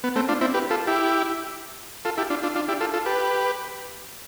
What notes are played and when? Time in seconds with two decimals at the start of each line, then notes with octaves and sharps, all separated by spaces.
0.04 B3
0.16 A3 C4
0.28 D4 F4
0.41 C4 E4
0.54 G4 B4
0.70 F4 A4
0.87 E4 G4
2.05 F4 A4
2.18 E4 G4
2.30 D4 F4
2.43 D4 F4
2.55 D4 F4
2.68 E4 G4
2.81 F4 A4
2.93 F4 A4
3.06 G4 B4